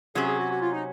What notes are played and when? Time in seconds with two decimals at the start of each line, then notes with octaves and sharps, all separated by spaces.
0.15 C3 F#3 C#4 G#4
0.27 G#4
0.39 F#4
0.51 F#4
0.62 F4
0.72 D#4